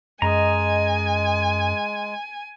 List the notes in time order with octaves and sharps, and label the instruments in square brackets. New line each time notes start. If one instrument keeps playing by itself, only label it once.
[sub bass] F#2 [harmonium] G#3 [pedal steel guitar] D#5 A#5 [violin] G#5